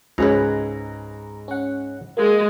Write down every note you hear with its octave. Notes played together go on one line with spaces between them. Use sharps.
C#2 G#2 G#4 B4 C#5 A#5 F#6
C#4 F#5
G#3 A#3